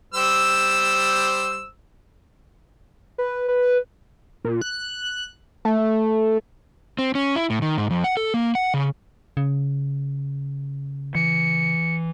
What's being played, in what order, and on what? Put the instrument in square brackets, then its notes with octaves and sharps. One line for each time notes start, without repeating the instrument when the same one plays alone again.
[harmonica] G3 C5 E6
[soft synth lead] B4
B4
[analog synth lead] A#2
F#6
A3
[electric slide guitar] C4
C#4
E4
A2
D#3
G#2
F2
F#5
A4
A#3
F#5
C#3
[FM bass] C#3
[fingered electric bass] E3 [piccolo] C#7